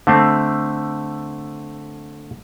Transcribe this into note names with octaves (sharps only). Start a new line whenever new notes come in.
D3 A3 C4